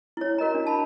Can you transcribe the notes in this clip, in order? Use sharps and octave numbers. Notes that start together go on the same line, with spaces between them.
E4 C#5
F#4 A#4 D#5 A#5
D4
A5 B5